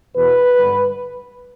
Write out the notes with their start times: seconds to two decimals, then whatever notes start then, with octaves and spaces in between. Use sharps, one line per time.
0.15 E2 B2 B4
0.58 G2 D3